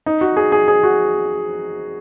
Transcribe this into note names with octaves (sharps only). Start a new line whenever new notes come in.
D#4
F#4
G#4
G#4
G#4
F#4